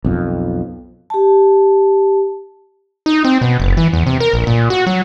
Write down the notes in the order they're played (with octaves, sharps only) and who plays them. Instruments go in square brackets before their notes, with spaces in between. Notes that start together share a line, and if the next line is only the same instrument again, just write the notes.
[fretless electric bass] B1 F2
[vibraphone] G4 A5
[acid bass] D#4
C4
B2
F#1
E3
E2
C3
A#4
A#1
A#2
F#4
F#3